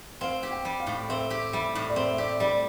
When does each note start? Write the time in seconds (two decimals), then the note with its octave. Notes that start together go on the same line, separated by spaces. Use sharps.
0.21 C4 F5
0.43 G4
0.51 G5
0.65 G3
0.80 F5
0.87 A2
1.09 C4 E5
1.30 G4
1.53 G3 E5
1.75 A2
1.89 D5
1.96 C4 E5
2.12 E5
2.18 G4 D5
2.40 G3 D5